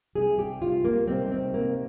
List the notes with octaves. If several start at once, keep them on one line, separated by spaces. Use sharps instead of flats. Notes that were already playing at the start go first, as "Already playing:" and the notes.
C3 G3 G#4
G4
F4
A#3
C3 D#3 G3 C4
C4
A#3